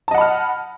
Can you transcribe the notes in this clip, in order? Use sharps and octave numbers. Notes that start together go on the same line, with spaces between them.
D#5 F#5 A5 B5 F6